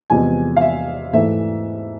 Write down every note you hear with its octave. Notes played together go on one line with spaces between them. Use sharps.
E2 C3 F3 G#3 B3 G#5
F5
E5
G#2 E3 A3 E5